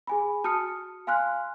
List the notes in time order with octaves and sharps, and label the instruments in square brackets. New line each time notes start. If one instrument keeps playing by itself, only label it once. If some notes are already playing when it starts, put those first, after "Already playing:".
[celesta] G#4 G#5 B5
F#4 A5 D#6 F6 C#7
F5 G#5 C6 F6 F#6